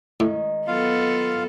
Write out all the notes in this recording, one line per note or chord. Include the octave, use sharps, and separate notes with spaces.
A2 D#3 G#3 C#4
F#3 B3 F4 A4 F5